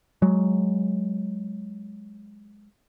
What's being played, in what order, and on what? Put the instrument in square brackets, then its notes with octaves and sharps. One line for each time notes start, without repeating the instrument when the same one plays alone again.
[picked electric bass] F#3 G#3